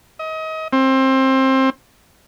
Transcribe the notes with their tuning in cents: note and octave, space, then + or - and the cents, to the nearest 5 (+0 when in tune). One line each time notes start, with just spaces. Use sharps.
D#5 +30
C4 +20